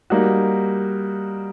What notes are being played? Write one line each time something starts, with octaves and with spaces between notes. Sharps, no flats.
G3 A#3 D#4 F#4